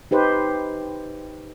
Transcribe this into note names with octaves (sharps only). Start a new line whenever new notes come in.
D#4 G4 B4 C5